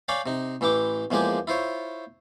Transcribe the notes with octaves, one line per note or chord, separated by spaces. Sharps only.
C#5 D5 F5 G5 G#5 B5
C3 D#4
A1 E3 E4 G5 D6
E2 F3 G#3 A#3 G4 G#5
E4 F4 C5 C#5